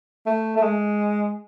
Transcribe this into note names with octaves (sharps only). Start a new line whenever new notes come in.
A3
A3
G#3